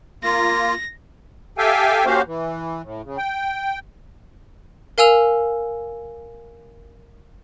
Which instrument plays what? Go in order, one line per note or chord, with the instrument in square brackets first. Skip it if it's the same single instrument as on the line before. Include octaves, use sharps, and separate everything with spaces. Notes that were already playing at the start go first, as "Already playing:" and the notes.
[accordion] A#3 F4 [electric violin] A#6
[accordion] G4 A4 E5 F5 G5 G#5
A#3 C#4 F#4 G4 C5 F5
E3
A2
C#3
G5
[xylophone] A#4 F5 G#5 E6 F7